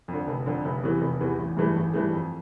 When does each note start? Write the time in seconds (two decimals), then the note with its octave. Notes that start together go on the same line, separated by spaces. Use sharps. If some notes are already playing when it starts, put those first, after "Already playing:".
0.08 F2
0.13 D3
0.27 F1
0.46 F2 D3
0.65 F1
0.83 E2 C3 E3
1.01 F1
1.20 E2 C3 E3
1.39 A1
1.57 G2 E3 A3
1.76 A1
1.93 G2 E3 A3
2.13 F2